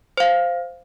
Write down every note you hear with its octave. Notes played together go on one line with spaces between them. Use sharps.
C5 F5